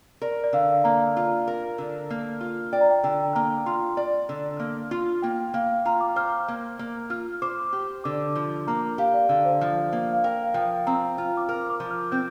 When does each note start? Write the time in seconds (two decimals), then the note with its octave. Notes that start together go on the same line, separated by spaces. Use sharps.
0.22 A#4 D5
0.44 D5
0.53 D3 F5
0.84 A#3 A#5
1.17 F4
1.48 A#4
1.78 D3
2.10 A#3
2.41 F4
2.72 D5 G5
2.81 A#5
2.91 G5
3.04 D3 G5
3.35 A#3 A#5
3.66 F4 C6
3.97 D5
4.29 D3
4.60 A#3
4.91 F4
5.22 A#3 G5
5.54 A#3 F5
5.85 F4 A#5
6.01 D6
6.16 C5 F6
6.48 A#3
6.79 A#3
7.10 F4 F6
7.42 C5 D6
7.73 G4
8.04 D3 D6
8.35 F3
8.67 A#3 A#5
8.98 G4 F5
9.14 D5
9.29 D3 F5
9.45 C5
9.61 F3
9.93 A#3
10.13 F5
10.24 A#4 G5
10.44 F5
10.54 F3 G5
10.87 C4 A#5
11.18 F4
11.37 D6
11.49 A#4 F6
11.70 D6
11.80 F3
11.90 F6
12.12 C4 G6